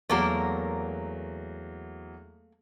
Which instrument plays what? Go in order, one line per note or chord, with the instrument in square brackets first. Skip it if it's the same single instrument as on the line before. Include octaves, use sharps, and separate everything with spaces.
[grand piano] E2 F#3 [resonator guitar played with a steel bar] A3 A#3 A#4